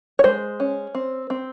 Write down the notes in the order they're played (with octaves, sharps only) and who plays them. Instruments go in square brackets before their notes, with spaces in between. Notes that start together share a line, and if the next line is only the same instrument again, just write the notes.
[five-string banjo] C#5
G#3 C5
C#4
C4
C4